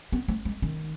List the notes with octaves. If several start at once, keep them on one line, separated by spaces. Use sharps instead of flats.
B3
A3
G#3
D#3